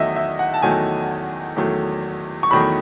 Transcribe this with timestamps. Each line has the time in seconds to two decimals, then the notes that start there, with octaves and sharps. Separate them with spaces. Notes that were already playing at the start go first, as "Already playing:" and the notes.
Already playing: E2 D#3 F#3 A3 D#5 E5
0.16 E5
0.39 F#5
0.54 A5
0.62 E2 D#3 F#3 A3 G#5
1.56 E2 D#3 F#3 A3
2.43 C#6
2.51 E2 D#3 F#3 A3 B5